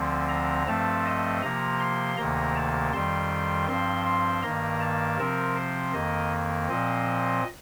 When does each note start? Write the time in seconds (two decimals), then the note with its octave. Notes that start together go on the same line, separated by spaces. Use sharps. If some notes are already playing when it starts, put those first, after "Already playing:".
Already playing: D2 D3 F3 C4
0.29 A#5
0.67 G2 F3 A3 C4 A5
1.05 D#5
1.42 C3 F3 A#3 A#5
1.80 C6
2.17 D2 C3 D#3 A#3 A#5
2.56 A5
2.93 F2 D#3 G3 C6
3.68 G2 F3 C4 C6
4.05 C6
4.43 G2 D#3 A#3 A#5
4.80 A5
5.18 C3 F3 C4 A#4
5.55 C5
5.93 F2 D#3 A#3 D#5
6.69 A#2 F3 C4 D#5